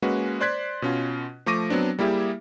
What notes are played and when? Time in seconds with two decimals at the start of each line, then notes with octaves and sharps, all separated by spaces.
0.02 G#3 A#3 C#4 F#4 B4
0.41 C5 D5 C6 F#6 G#6 B6
0.82 B2 C#4 F4
1.46 F3 A3 C#6 D6 A#6 D#7
1.70 F#3 B3 C4 D4
1.99 G3 A#3 E4 G4 G#4 E5